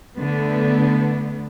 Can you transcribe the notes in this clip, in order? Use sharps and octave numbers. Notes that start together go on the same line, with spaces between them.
D3 A3 B3